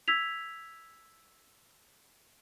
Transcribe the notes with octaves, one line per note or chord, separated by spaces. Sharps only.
E6 G#6 B6 F7